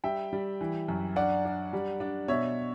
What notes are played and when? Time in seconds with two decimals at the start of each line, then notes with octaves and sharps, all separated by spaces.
0.04 G3 E5 G5
0.33 G3
0.61 E3
0.88 F#2
1.16 D4 D5 F#5
1.45 D4
1.73 G3
2.00 D4
2.28 B2 C#5 E5